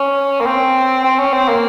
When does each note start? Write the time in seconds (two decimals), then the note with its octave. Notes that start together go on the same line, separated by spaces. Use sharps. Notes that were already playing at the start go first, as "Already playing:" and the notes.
Already playing: C#4
0.41 A#3
0.46 C4
1.04 C4
1.19 C#4
1.33 C4
1.48 A#3